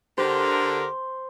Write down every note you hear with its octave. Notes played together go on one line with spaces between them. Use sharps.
D3 G4 A#4 C5